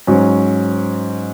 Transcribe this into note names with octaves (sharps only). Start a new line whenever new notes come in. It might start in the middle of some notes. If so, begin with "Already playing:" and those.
G#2 F#3 C#4